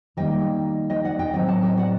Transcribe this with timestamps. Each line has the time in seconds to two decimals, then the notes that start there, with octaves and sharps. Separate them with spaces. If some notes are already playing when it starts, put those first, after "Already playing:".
0.17 D#3 G3 A#3 D#5 G5
0.90 D#5 G5
1.04 D5 F#5
1.19 D#5 G5
1.34 A2 F#3 C4 D#5 G5
1.48 F#5 A5
1.63 D#5 G5
1.77 D5 F#5